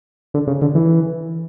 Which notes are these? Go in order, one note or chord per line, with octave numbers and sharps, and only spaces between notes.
D3
C#3
D3
E3